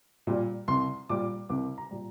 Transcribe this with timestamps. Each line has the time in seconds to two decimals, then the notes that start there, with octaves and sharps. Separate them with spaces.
0.27 A#2 G3
0.68 C2 C6
1.09 A#2 G3 D6
1.49 C2 D6
1.78 A#5
1.91 A#2 G3